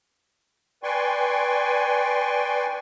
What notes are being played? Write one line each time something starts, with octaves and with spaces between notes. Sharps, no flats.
B4 D5 G5 G#5 C6 C#6